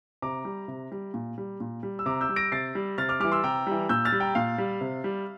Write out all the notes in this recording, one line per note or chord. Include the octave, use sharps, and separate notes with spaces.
C3 A#5 D6
G3
C3
G3
A#2
G3
A#2
G3
E6
C3 A#5 D6
E6 G6
G3
A#6 D7
C3 A6 C7
G3
C3 F6 A6
D6 F6
E3 G3 D6 F6
C6 E6
C3 G5 A#5
E3 G3
A#2 E6 G6
F6 A6
G3
G5 A#5
A#2 F5
G3
C3
G3